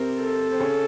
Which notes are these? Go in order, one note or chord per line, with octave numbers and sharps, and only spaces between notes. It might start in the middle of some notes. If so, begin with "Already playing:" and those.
Already playing: C3 C4 A#4
A4
C4
C#3 C#4